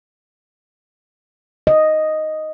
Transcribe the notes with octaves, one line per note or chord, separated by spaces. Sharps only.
D#5